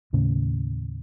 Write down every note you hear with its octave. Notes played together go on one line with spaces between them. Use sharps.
D#2 A2 C#3